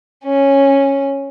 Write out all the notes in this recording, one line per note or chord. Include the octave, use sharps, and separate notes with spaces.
C#4